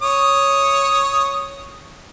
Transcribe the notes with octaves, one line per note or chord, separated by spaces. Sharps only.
C#5 D#6